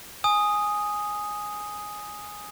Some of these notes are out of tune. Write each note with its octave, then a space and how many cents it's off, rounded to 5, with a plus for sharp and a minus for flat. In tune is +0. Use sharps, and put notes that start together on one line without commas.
G#5 +0 D#6 +0